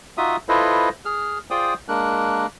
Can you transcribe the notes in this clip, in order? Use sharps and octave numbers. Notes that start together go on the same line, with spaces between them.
D#4 F4 F#4 E5 D#6
E4 F4 A4 B4 C5 D#5
G#4 F6
F4 G#4 C5 D5 G5 D#6
G#3 A#3 D4 A#4 F#6